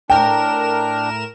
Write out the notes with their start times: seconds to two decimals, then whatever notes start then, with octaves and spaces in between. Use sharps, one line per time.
0.10 A2 D4 A#4 G5 E7